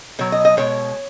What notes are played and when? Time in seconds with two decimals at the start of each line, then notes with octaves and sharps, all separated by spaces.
0.19 B2 F#3 C#5
0.32 D#5
0.45 D#5
0.57 B2 G#3 C#5